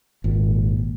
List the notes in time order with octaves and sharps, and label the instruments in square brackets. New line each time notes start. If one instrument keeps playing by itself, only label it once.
[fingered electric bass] G#1 A#2